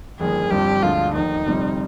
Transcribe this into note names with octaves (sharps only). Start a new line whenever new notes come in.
G1 F2 D#3 A#3 G#4
G1 G2 F3 C4 G4
D2 D3 F3 G#3 F4
F1 D#2 D#3 D#4
G1 F2 C3 G3 C4